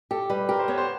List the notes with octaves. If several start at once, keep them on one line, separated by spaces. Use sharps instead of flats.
G4 A4
G3 B4
G4 A#4
C5
B3 C#5
C5